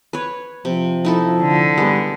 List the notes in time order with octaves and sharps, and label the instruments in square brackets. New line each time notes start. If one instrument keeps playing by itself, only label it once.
[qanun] B4 C#5
[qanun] C3 [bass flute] F3
[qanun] D#4 E4 A4
[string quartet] D3
[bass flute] G3 [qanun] G#3 B3